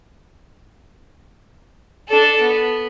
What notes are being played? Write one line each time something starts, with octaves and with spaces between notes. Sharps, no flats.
D4 A4
B3